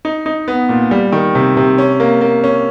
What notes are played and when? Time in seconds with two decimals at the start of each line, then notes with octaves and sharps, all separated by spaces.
0.05 D#4
0.26 D#4
0.48 B3
0.69 A#2
0.91 G3
1.12 D#3
1.35 C3
1.57 C3
1.78 C#4
2.00 A#3
2.21 A#3
2.44 C#4